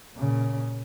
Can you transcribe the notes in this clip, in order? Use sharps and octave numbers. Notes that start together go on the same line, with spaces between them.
A#2 C#3